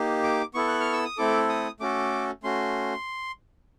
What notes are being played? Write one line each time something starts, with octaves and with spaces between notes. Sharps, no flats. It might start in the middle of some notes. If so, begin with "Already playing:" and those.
Already playing: A#3 D#4 G4
D6
B3 E4 A4 C#6
F#6
F6
E6
D#6
A3 C4 E4 A4 D6
D#6
A3 C#4 F#4 A4 D6
A3 C#4 F#4 C6